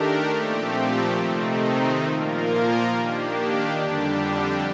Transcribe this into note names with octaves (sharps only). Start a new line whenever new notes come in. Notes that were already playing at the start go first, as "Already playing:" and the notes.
Already playing: D#3 A3 D4 G4 A#4
A#2 F3 A3 C4 G4
C3 D#3 A3 C4 D#4
A#2 F3 A#3 F4 A#4
D#3 A#3 D4 G4
F2 D3 G3 D4 G4